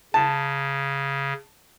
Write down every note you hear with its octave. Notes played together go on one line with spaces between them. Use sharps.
C#3 A5